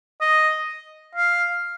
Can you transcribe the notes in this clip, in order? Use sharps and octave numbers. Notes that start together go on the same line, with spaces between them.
D#5
F5